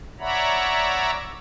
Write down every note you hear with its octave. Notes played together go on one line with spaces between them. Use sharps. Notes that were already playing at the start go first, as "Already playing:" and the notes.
C#5 D5 E5 F#5 A#5 B5